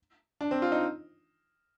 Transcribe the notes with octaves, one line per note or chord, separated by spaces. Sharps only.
D4
C4
F4
D#4